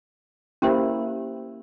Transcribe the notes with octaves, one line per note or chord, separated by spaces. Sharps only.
A#3 C#4 E4 G4 C5